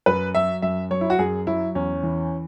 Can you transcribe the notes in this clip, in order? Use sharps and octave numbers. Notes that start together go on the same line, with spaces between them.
F#2 B4
F#3 E5
F#2 E5
F#3 C#5
E4
F#4
F#2 G#4
F#3 E4
E2 C#4
E3